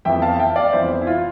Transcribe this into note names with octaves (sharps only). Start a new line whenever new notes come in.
F2 E3 B3 E5 G5
F5 A5
E5 G5
D5 F5
F2 E3 B3 C5 E5
E4
F4